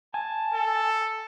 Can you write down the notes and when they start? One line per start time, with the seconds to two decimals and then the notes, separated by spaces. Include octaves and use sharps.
0.14 G#5 A5
0.54 A4